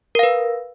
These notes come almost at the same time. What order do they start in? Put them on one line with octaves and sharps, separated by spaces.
A#4 F5 B4